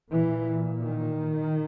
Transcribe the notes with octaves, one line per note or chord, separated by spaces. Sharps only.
A#2 E3
D#3